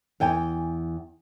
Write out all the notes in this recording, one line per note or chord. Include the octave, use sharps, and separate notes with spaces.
E2 G5 G#5